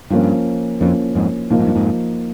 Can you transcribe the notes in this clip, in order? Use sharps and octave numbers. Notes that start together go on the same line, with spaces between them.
G2 F3 A#3 C#4
F2 F3 A#3 C#4
F2 G#2
A#2 F3 A#3 D#4
G#2
G2
F2 G#2